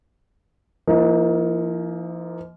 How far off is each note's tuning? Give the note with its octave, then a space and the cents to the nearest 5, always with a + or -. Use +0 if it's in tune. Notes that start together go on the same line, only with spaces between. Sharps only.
F3 -40 A#3 +0 D#4 +30